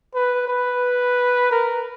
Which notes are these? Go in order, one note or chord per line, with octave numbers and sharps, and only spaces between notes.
B4
B4
A#4